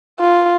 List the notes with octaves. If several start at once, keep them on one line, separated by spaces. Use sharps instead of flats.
F4